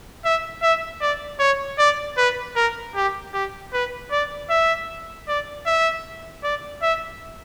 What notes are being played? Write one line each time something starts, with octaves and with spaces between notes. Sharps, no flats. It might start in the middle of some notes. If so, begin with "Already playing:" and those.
E5
E5
D5
C#5
D5
B4
A#4
G4
G4
B4
D5
E5
D5
E5
D5
E5